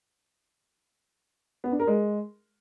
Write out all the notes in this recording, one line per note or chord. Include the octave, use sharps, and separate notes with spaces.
B3
D4
A#4
G#3